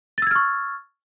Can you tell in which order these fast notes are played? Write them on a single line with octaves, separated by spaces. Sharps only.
A6 E6 G#6 F6 C#6